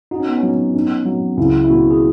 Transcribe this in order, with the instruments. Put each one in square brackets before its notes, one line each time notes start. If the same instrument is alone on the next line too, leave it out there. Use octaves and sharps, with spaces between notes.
[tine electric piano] D#4 [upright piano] F#4
[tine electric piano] C#4
B3
[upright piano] F#3 [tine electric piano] C#4
[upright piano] D#4
F#3
[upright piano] C#2 [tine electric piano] E4
[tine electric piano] E4
[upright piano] B2 [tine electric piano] F#4
[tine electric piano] G#4